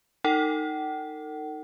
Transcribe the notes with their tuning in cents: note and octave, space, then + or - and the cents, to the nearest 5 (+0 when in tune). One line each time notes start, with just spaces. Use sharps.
D#4 +0 A4 +45 F#5 +45